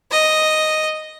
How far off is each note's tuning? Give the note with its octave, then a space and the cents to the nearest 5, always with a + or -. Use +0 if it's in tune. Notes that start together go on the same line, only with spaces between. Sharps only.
D#5 +0